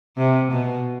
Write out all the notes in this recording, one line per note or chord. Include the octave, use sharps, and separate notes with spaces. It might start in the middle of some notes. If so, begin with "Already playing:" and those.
C3
B2